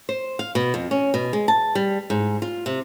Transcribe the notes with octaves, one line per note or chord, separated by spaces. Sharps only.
C5
F5
B2
F2
C#4
B2
G#3
A5
G3
G#2
F4
C3